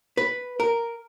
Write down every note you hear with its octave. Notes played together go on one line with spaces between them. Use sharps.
B4
A#4